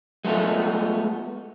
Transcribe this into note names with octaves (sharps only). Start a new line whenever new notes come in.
G#3 A3 B3 F4